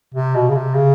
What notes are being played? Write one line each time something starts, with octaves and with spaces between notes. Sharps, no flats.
C3
B2
C#3
C3
C#3